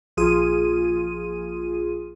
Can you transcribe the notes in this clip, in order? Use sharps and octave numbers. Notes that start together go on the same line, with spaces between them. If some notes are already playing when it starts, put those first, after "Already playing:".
A#1 F4 G#4 D#7